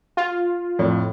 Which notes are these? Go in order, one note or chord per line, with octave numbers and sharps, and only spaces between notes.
F4
F2 A2